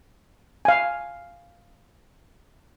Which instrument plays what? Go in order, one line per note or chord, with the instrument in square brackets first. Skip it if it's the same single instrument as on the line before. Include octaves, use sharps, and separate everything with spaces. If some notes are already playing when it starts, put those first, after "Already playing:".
[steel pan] F5 G#5